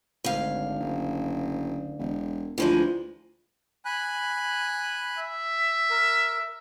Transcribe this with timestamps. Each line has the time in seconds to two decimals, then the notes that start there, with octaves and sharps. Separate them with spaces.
0.24 G#1 D2 F5
0.80 F#1
1.99 E1
2.58 D2 E3 F3 G#3
3.85 G#5 B5 F#6
5.19 E5
5.90 A#4